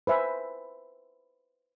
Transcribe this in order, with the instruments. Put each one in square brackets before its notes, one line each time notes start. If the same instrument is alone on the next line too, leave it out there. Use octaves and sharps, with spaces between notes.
[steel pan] B4 C5 E5 G#5